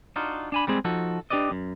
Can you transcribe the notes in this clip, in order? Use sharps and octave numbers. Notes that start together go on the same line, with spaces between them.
D4 D#4 F4 F#4
D4 G#5 B5
G3 G#3 C4 G#4
F3 D#4 F#4 A4
D4 G4 B4 D5 D#5
F#2